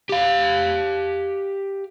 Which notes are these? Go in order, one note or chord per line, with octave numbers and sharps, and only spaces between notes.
G4 F5